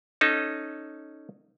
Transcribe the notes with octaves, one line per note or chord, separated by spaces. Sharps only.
C#4 D#4 A4